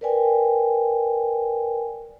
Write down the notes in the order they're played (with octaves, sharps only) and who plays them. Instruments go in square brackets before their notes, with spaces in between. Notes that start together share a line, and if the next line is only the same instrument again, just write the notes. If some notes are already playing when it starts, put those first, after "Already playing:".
[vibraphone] A#4 B4 D5 G5 G#5